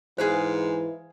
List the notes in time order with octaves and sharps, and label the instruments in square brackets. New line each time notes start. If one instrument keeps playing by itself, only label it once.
[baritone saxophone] G#2 [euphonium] E3 [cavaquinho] G#4 F5 B5 [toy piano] C5